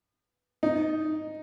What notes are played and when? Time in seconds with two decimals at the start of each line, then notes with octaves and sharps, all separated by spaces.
0.63 D#4